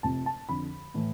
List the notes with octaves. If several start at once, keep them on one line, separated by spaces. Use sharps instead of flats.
F1 F2 C3 A5
A5
F2 D3 F3 B5
A2 E3 A3